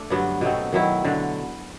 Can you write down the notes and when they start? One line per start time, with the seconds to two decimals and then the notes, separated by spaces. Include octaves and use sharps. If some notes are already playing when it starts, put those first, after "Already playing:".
Already playing: A3 D4
0.10 G2 D3 F#3 B3
0.41 B2 F#3 A3 C4
0.72 D#3 F#3 B3 E4
1.04 D3 F#3 B3